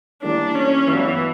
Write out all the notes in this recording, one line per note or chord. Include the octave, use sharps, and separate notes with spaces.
E3 G3 A#3 D4 E4
C#4
G2 E3 F#3 B3